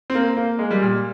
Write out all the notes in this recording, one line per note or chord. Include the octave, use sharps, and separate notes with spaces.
C4
A#3
A#3
G#3
G3
A#2